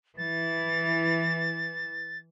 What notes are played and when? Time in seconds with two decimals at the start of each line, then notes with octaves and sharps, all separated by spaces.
0.17 E3 A6